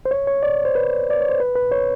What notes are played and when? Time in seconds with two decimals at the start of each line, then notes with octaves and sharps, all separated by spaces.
0.05 C5
0.11 C#5
0.27 C#5
0.43 D5
0.65 C5
0.75 B4
1.10 D5
1.21 C#5
1.29 C5
1.40 B4
1.55 B4
1.72 C#5